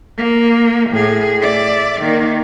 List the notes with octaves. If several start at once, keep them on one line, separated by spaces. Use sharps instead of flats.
A#3
A2 G#4
D5 E5
D#3 A#3